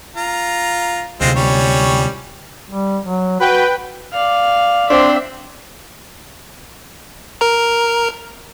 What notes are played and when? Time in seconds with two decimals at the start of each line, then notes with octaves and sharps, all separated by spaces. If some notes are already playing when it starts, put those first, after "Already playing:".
0.16 F4 A#5
1.21 D2 C3 G#3 C4 F4
1.36 G3 C#4 C#5
2.70 G3
3.05 F#3
3.40 F#4 B4 G5
4.12 D5 F5
4.89 C4 D4 C5 E5 D6
7.41 A#4 A#5